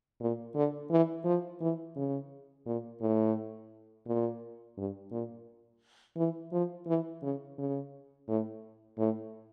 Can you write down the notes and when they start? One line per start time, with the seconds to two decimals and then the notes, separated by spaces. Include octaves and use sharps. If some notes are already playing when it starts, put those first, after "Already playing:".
0.20 A#2
0.55 D3
0.91 E3
1.25 F3
1.61 E3
1.96 C#3
2.66 A#2
3.01 A2
4.07 A#2
4.77 G2
5.11 A#2
6.17 E3
6.52 F3
6.87 E3
7.22 C#3
7.58 C#3
8.28 A2
8.98 A2